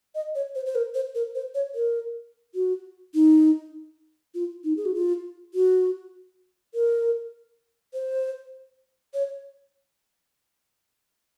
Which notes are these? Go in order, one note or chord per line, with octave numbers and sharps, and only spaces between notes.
D#5
C#5
C5
C5
A#4
C5
A#4
C5
C#5
A#4
F#4
D#4
F4
D#4
G#4
F#4
F4
F#4
A#4
C5
C#5